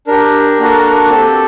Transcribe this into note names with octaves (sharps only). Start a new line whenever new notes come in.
D4 G4 A#4
A#3 D4 F#4 A4
C4 G4 A4